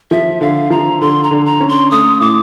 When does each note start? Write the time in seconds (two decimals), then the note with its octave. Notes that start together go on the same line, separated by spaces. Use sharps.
0.11 F3 E5
0.41 D3 F5
0.70 F3 A#5
1.01 D3 C6
1.23 A#5
1.31 D3
1.46 A#5
1.61 C#4
1.69 C6
1.91 A3 D#6
2.20 A2 D6